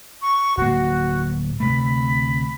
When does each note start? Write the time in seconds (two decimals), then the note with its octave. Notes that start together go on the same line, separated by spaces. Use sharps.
0.22 C#6
0.57 D1 A#3 F#4
1.60 D2 C3 A3 B5